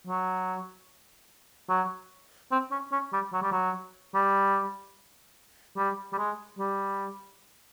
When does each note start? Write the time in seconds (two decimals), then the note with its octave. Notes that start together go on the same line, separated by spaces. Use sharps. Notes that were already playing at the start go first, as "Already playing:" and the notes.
0.07 F#3
1.70 F#3
2.52 C4
2.71 C#4
2.92 C#4
3.13 G3
3.33 F#3
3.43 G3
3.52 F#3
4.15 G3
5.77 G3
6.13 G3
6.18 G#3
6.59 G3